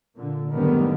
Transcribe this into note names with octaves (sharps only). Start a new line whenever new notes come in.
A#2 D3
F#1 A2 D3 D#3 G3 B3